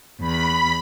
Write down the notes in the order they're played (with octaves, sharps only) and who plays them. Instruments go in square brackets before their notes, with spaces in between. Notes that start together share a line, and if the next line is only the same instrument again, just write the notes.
[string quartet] E2 [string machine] B5